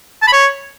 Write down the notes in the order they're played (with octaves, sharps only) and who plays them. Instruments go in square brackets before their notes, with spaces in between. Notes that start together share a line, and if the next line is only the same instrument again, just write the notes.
[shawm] A5
B5
C#5